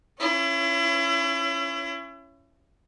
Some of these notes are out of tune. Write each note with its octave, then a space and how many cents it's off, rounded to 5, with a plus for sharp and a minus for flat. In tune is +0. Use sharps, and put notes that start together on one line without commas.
C#4 +0 E4 +35